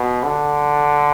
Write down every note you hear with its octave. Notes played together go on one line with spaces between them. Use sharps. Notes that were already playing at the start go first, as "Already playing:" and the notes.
Already playing: B2
D3